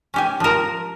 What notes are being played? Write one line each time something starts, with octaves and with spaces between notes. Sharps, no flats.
C#4 G4 G#5
F3 A#4